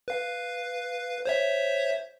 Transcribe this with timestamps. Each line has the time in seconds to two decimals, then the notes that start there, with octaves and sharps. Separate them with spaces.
0.08 B4 F5
1.25 C5 C#5 E5